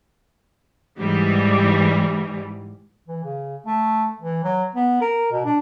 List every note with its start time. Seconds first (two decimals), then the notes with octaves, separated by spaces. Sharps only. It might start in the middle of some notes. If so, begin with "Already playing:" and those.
0.98 G#2 E3 G3
3.08 E3
3.24 C#3
3.66 A3
4.21 E3
4.44 F#3
4.75 B3
5.01 A#4
5.31 B2
5.45 D4